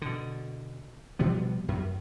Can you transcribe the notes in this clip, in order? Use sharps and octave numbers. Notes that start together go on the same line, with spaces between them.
B2 D3
B2 F3 G3 B3
F#2